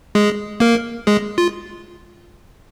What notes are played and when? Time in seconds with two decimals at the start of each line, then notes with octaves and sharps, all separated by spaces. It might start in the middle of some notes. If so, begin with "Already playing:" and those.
0.15 G#3 G#4
0.60 A#3 A#4
1.07 G#3 G#4
1.38 F4